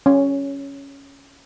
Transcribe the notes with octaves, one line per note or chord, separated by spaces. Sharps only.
C#4